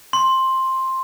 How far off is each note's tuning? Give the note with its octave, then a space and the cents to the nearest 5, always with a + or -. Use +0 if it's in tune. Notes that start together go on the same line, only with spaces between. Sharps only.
C6 +10